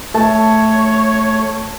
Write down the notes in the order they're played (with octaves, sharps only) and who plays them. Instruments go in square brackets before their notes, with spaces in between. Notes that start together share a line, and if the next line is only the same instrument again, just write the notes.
[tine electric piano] A3 [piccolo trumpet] C#5 [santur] A5